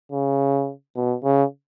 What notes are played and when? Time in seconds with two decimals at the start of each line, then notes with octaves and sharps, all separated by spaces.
0.12 C#3
0.96 B2
1.24 C#3